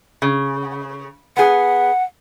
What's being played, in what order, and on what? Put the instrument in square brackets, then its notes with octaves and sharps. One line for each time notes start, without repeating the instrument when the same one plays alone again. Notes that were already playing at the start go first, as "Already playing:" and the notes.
[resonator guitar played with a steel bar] C#3
[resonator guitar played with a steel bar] B3 G#4 [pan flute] F#5